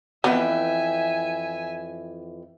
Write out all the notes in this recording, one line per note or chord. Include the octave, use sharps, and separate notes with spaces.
F2 E3 B3 E5 G5 G#5